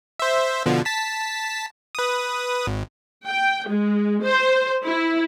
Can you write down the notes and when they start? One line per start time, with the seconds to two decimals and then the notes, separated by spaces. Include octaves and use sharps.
0.20 C5 E5
0.66 B2 D3 F3
0.85 A5 B6
1.95 B4 D#6
2.67 G#1
3.25 G5
3.67 G#3
4.22 C5
4.85 E4